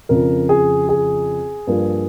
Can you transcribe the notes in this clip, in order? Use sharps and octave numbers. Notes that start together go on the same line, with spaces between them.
F2 C#3 F3 A#4
G#4
G#4
G2 F3 A#3